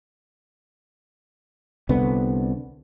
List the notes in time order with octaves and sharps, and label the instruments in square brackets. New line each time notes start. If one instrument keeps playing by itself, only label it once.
[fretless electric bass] C2 D3 B3